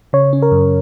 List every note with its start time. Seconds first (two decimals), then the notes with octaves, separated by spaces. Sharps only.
0.13 C#3 C#5
0.33 C#4
0.42 A#4
0.52 F#2